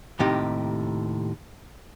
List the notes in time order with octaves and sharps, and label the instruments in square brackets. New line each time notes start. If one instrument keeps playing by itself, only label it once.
[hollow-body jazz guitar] D#2 A2 C3 D#4 G4